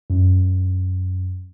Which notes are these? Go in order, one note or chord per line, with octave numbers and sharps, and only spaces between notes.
F#2